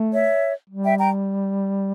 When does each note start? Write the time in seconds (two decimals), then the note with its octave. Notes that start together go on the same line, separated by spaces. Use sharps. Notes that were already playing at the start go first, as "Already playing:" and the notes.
Already playing: A3
0.12 C#5 E5
0.70 G3
0.84 E5 G5
0.98 G5 A#5